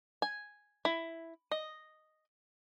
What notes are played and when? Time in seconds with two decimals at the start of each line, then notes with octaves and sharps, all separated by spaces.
0.22 G#5
0.85 E4
1.51 D#5